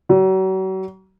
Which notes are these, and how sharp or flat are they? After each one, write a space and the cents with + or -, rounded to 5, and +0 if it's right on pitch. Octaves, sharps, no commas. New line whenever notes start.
F#3 +40